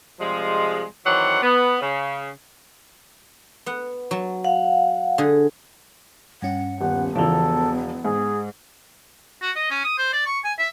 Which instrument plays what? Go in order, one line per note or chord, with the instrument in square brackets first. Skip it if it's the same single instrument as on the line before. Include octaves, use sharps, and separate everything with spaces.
[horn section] C3 F3 G3 G#3
D#3 E3 F#3 C4 D5 F#5
B3
C#3
[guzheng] B3 F#5
F#3 A5
[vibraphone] F5 F#5
[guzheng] D3 G#4
[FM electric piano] G2 C#4 [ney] F#5
[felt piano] D#1 [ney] B3 [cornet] F#5
[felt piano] E1 F3 [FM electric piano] C#3 E3 [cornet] A4
[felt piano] G#2 [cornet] G#4
[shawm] F#4
D#5
C#4
D#6
C5
D5
C#6
G#5
E5